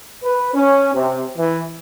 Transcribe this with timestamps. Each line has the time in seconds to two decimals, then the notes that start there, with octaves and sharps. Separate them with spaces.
0.24 B4
0.54 C#4
0.95 C3
1.38 E3